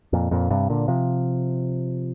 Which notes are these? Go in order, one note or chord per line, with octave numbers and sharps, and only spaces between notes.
F2 A#2
F2 A#2
G2 C3
A#2 D3
C3 F3